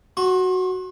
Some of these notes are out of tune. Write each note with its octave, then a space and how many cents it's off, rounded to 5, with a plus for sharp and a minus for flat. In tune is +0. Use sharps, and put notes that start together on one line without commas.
F#4 +0 C6 +40